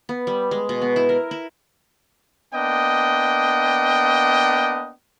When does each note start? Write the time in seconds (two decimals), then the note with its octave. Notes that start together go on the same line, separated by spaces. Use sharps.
0.09 B3
0.27 G3
0.51 G#3
0.69 B2
0.82 B3
0.96 E4
1.09 A#4
1.31 E4
2.53 A#3 B3 D4 D#5 G5